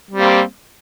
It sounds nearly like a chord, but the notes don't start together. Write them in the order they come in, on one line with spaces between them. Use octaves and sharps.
G3 C4 A#3